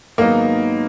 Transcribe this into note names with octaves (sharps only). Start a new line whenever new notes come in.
G#2 D#3 F#3 A#3 B3 D#4